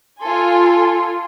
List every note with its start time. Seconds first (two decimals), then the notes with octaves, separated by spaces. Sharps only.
0.21 F4 A4 G#5 C6